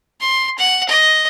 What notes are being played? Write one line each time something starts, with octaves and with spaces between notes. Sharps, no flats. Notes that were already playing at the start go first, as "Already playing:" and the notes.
C6
F#5
D#5